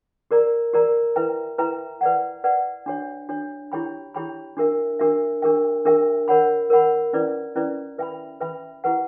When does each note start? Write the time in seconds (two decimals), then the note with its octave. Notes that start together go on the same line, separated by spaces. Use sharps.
0.31 F#4 A#4 D5 A#5
0.73 F#4 A#4 D5 A#5
1.16 E4 B4 E5 G5 A#5
1.58 E4 B4 E5 G5 A#5
2.01 B4 D5 F#5
2.44 B4 D5 F#5
2.86 D4 F#4 C#5
3.29 D4 F#4 C#5
3.72 E4 G4 C#5 G5 B5
4.14 E4 G4 C#5 G5 B5
4.57 D4 F#4 A#4 E5
4.99 D4 F#4 A#4 E5
5.42 D4 G4 A#4 E5 G5
5.85 D4 G4 A#4 E5 G5
6.28 A#4 C#5 F#5 B5
6.70 A#4 C#5 F#5 B5
7.13 C#4 E4 B4 D5
7.55 C#4 E4 B4 D5
7.98 B4 E5 G5 B5
8.41 B4 E5 G5 B5
8.84 E4 G4 B4 F#5